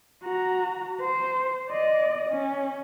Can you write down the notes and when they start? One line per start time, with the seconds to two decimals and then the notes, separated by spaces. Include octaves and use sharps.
0.24 F#4 A#5
1.01 C5
1.71 D5 D#5
2.29 C#4